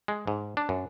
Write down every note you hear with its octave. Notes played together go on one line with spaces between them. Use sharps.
G#3
G#2
D4
F#2